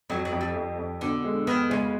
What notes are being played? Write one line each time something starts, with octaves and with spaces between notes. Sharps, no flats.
F2 F#3
F#3
F2
G3
F2
F2
B2 D3
G#3
D#3 B3
C#3 G#3